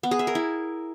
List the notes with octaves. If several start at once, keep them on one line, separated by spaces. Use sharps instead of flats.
B3
G#4
E5
A#4
E4